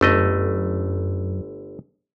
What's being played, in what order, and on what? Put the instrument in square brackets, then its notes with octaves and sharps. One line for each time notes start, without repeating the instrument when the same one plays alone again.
[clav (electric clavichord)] G1 A3 D#5 [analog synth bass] F#2